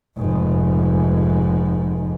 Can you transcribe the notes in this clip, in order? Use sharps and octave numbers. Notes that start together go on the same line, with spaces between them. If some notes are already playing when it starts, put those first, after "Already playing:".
F1 G#2